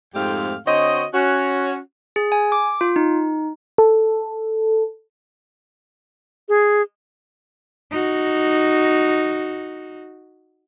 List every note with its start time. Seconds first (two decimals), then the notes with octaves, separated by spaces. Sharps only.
0.15 F2 G#2 A3 C4 G4 F5
0.66 D3 C4 F#4 C#5 D#5
1.13 C#4 F#4
2.16 G#4
2.32 G#5
2.52 D6
2.81 F4
2.96 D#4
3.78 A4
6.49 G#4
7.91 D#4 F#4